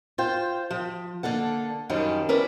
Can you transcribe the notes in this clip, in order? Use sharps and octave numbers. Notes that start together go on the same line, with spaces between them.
F4 C5 G5
F3
D3 A#3 A4 F#5
F#2 D#3 F3 G3 C#4 D4
C#4 E4 A#4 B4 D5